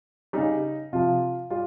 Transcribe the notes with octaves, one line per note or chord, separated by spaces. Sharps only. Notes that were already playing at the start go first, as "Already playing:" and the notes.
C#3 G3 D#4
C3 F3 F4
G3 F4